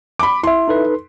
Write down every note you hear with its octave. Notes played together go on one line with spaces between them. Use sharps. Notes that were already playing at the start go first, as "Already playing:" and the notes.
B5 D6
E4 E5 C6
D#4 A4 B4